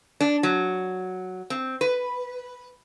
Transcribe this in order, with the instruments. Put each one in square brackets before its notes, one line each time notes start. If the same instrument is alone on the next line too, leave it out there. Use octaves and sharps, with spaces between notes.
[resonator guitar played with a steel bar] D4
F#3
C4
B4